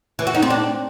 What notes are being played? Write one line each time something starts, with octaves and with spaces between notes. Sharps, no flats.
E3
F#4
D#4
C4
D4